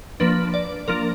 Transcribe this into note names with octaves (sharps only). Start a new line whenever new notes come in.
F3 A#3 D4 B4
D5
F3 A#3 D4 A#4